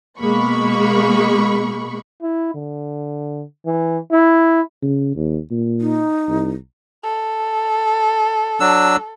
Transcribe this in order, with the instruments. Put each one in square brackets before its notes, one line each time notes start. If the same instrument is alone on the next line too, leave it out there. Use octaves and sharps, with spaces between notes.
[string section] B2 G#3 A#3 B5 C#6
[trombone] E4
D3
E3
E4
[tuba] C#3
D#2
A#2
[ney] D#4
[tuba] C2
[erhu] A4
[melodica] F#3 D4 E6